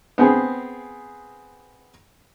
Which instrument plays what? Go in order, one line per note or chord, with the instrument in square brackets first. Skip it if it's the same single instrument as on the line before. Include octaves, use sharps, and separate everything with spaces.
[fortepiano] B3 C4 G#4